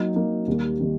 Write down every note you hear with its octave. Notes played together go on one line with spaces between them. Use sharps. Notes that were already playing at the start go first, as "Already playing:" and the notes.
Already playing: F#3 A#3 D#4
F#3 A#3 D#4
D#2 D#3 G3 A#3
D#3 G3 A#3